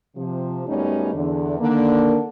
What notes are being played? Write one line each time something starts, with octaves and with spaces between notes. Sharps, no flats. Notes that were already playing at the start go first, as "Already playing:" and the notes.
C3 F3
F#2 G3 A3 B3 C#4 D#4
E2 D3
D3 D#3 A#3